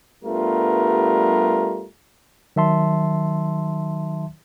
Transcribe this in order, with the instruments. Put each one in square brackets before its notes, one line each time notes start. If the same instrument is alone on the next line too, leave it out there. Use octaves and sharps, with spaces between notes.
[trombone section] G2 G3 A3 B3 F4 A#4
[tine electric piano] D#3 F#3 E5 A5 C6